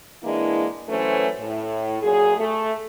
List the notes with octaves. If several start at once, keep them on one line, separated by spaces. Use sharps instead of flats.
E3 G#3 A#3 D4 E4
E3 F#3 A3 C#4 B4 C5
A2
F#2 A#2 F#3 G#4
A3